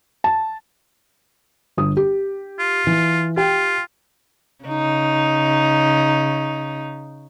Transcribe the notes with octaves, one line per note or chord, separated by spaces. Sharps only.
A5
G1 D#6
G4
F4
E3
F4 G4 G5
C#3 D#4